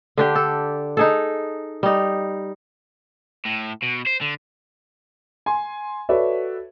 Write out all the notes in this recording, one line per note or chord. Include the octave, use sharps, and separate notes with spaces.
D3 D4 G4
A4
D#4 G#4 A4
G3 D#4
A2
B2
C5
D3
G#5 C6
F#4 A4 B4 C#5 D5 E5